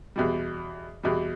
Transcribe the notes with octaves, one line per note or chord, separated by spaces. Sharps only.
E2 B2 G3
E2 B2 G3